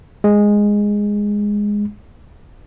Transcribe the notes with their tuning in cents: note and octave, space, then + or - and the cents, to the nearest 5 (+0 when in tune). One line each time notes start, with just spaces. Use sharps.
G#3 -5